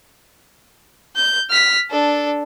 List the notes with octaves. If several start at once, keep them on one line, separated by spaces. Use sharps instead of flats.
G6
F6 B6
D4 A4